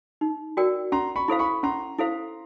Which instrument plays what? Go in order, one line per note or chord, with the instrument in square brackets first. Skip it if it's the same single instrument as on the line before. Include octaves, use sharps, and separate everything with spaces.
[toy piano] D#4
F#4 A#4 D5 G5
[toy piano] C#4 [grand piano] A#5 C6
[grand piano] B5 C#6
[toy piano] E4 A4 C5 F5
[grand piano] B5 C#6
[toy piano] C#4 [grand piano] A#5 C6
[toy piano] E4 A4 C5 F5